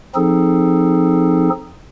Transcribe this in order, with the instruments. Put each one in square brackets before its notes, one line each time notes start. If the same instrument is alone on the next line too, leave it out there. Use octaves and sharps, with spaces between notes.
[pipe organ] F3 C4 D#4 G#4 A4